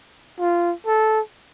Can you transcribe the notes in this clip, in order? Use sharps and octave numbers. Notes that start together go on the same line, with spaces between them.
F4
A4